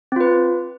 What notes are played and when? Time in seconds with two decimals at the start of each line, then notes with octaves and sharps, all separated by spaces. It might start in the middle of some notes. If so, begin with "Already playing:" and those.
0.12 C4
0.16 F4
0.21 B4